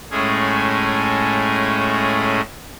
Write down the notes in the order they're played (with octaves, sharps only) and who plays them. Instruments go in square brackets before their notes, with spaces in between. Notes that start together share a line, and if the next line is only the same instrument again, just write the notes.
[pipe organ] A2 G#3 A3 C#4 G#4